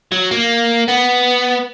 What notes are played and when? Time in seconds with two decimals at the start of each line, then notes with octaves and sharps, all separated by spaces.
0.12 F#3
0.31 A#3
0.89 B3